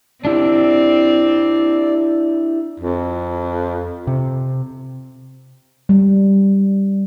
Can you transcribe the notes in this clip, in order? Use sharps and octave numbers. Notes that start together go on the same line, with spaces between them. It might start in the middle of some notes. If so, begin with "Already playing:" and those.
C4 D4 E4 G4 D5
F2
C3
G3